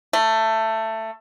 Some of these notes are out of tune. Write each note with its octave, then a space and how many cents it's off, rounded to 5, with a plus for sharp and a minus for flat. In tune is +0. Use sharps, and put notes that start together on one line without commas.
A3 +15